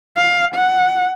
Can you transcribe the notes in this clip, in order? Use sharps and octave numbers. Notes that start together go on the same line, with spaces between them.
F5
F#5